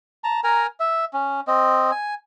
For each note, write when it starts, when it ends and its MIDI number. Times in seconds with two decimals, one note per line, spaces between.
0.24 0.40 81
0.24 0.40 82
0.44 0.67 70
0.44 0.67 80
0.44 0.67 82
0.80 1.05 76
1.13 1.41 61
1.47 1.91 60
1.47 1.91 75
1.91 2.14 80